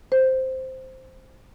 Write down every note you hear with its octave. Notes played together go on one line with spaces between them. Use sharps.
C5